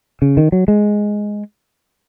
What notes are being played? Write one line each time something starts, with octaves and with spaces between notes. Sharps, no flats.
C#3
D#3
F#3
G#3